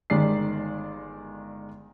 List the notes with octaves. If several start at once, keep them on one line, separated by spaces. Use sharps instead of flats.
G1 D#3 G#3 D5 C7